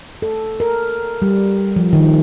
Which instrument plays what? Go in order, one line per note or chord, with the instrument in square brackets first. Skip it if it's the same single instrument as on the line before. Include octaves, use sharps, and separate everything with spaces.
[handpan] A4
A#4
G3
F3
D#3